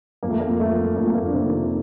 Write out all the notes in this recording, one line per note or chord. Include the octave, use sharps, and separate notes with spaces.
F2 A#3
A3
A#3
F2
A3
F2
F2 A#3
A3
A#3
F2 D4
C3 C4
D#3